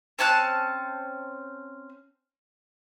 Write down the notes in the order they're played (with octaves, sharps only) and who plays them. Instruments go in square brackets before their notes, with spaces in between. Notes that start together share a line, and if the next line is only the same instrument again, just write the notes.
[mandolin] C4 C#4 A5 F#6